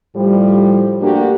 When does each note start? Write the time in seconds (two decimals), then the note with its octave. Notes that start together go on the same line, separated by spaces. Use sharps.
0.15 A2 F3 G3
1.00 A3 A#3 D4 F#4 G4